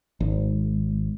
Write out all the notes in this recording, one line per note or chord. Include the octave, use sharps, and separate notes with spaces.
G#1